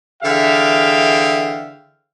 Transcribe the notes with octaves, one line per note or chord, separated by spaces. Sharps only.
D3 E3 G#4 E5 F5 G5